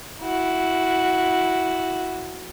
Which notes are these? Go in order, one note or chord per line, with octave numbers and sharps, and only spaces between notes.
E4 F#4